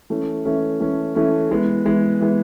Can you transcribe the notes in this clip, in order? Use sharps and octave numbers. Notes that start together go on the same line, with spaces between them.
E3 A3 C#4
E3 A3 C#4
E3 A3 C#4
E3 A3 C#4
E3 G#3 B3
E3 G#3 B3
E3 G#3 B3